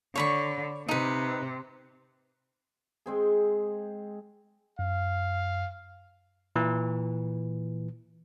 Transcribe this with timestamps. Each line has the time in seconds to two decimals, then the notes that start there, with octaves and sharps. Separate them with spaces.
0.16 D3 C#5 B5 C#6
0.89 C3 D#4 B4
3.06 G#3 C4 G#4
4.79 F#2 F5
6.56 A#2 E3